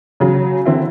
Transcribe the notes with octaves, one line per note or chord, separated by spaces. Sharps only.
C#3 F#3
D3 C4 E4